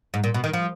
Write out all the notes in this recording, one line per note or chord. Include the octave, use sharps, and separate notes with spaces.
G#2
A#2
B2
D#3
F3